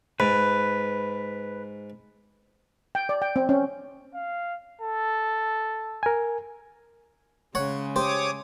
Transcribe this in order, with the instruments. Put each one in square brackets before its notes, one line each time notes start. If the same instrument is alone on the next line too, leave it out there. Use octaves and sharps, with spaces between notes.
[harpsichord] G#2 [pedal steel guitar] B4
[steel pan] G5
D5
G5
C4
C#4
[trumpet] F5
A4
[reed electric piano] A#4 G#5
[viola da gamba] C#3 G#3 [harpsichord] C#5 F#5
[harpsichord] G4 C5 [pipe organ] C#5 D6 D#6